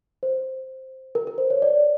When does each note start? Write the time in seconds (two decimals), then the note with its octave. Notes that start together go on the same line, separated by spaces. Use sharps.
0.23 C5
1.15 A#4
1.27 A#4
1.38 C5
1.50 C#5
1.62 D5